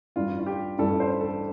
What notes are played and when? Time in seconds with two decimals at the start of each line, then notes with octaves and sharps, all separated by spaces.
0.16 A1 G2 G3 F4
0.40 F4
0.46 G4
0.78 A1 G2 G3 A4
1.00 C5
1.21 A4